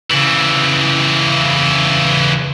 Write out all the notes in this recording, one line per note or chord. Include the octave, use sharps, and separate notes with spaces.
C#3 E3